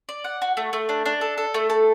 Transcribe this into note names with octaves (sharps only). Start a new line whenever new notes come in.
D5
F#5
F#4
A3
A3
D4
D4
A4
A4
A3
A4